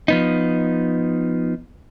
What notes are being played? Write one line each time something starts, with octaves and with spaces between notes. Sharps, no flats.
F3 B3 D#4